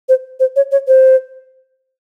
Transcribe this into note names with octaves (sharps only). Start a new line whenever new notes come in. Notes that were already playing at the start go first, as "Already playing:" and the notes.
C5
C5
C#5
C#5
C5